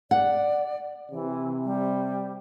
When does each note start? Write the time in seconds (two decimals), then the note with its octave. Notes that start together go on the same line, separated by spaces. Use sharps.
0.11 D5 F#5
1.11 C3 E3
1.64 G3